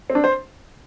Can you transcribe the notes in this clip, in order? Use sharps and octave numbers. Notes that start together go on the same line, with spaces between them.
C4
D4
C5